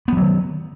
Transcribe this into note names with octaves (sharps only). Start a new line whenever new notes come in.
D#3 F3 F#3 B3